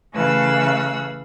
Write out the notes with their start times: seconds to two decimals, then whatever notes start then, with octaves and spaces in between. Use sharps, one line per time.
0.13 C#3 E3 A3 F5 E6 F#6